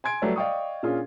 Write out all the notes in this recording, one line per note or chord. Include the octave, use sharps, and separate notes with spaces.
G#5 C6 G#6 D7
F#3 G3 A3 B4 C#5 D5
D5 D#5 F5 G5 C#6 D#6
A#2 C#4 D4 F4 G#4